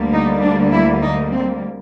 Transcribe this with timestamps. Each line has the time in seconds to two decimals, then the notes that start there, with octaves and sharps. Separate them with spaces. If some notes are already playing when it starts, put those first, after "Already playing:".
Already playing: D2 D3 G3 A#3
0.12 D#4
0.42 D4
0.72 E4
1.02 D#4
1.32 C4